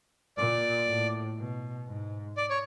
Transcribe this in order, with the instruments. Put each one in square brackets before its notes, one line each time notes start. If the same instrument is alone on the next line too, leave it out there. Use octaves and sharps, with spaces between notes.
[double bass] A#2 [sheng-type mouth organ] D5
[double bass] A2
B2
G#2
[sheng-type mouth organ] D5
C#5